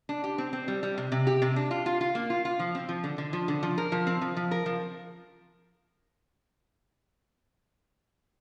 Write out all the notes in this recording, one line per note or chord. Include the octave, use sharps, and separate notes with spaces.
D4
G4
C4
C4
G3
G3
C3
C3
G4
C3
D4
F4
F4
F4
A#3
F4
F4
F3
C4
F3
D3
D3
F3
D3
F3
A#4
F3
C4
F3
F3
A#4
F3